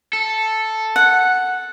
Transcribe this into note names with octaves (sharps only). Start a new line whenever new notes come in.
A4
F#5